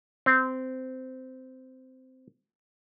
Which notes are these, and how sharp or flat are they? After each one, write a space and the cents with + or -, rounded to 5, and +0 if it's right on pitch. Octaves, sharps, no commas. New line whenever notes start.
C4 -15